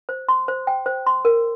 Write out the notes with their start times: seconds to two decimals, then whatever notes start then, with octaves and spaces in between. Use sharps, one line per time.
0.09 C5
0.29 C6
0.48 C5
0.67 G5
0.86 C5
1.07 C6
1.25 A#4